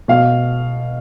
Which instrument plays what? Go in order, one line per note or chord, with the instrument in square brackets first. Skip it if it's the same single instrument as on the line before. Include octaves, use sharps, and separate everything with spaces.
[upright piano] B2 F5